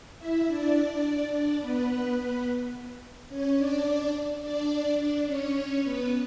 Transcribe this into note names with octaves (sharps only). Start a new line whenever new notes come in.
E4 E5
D4 D5
D4 D5
B3 B4
B3 B4
B3 B4
C#4 C#5
D4 D5
D4 D5
D4 D5
C#4 C#5
B3 B4